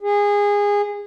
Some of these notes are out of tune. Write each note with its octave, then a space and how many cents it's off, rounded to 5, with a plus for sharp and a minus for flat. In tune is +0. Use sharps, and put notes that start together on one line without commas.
G#4 -25